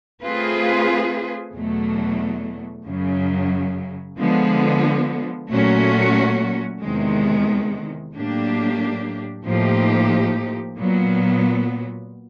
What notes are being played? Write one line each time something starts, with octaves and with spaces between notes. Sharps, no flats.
A3 C4 F4 G#4 B4
E2 B2 F#3 A3
F#2 C#3 F#3
D3 F3 G#3 B3
A#2 F#3 A3 C#4 F#4
E2 C3 D#3 G#3
A2 F#3 A#3 D4 G4
A2 F3 A#3 D#4 G4
A#2 F#3 B3